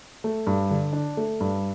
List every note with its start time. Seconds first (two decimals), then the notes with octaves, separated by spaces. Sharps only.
0.24 A3
0.47 G2
0.71 D3
0.93 D4
1.17 A3
1.40 G2